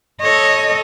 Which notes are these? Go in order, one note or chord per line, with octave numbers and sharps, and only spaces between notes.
A4 C#5 D#5